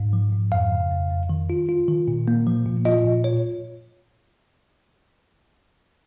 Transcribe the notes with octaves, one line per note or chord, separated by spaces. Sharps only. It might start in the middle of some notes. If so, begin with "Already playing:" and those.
Already playing: G#2
F3
G#2
F2 F5
C#3
F2
F2
D#3
F4
F4
D#3
A#2
A#3
F3
A#2
F4 D#5
A#2
F4 C#5